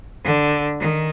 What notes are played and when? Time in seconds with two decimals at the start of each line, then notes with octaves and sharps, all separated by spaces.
0.24 D3
0.80 D#3